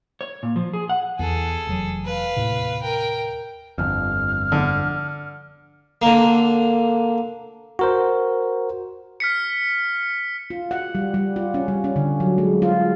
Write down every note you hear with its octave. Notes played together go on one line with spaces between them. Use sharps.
C#5
A#2
F3
G#4
F#5
E2 E3 G#4 A4
F1 E3 F#3
B4 F5
D#2 A2 C3
A#4 G5
G1 F2 F6
D3
D3 A#3
F#4 A#4 C5
F6 B6 C#7
F4
F#5
G3
G3
F4
C#4
G3
C#4
D3
F#3
G#3
F4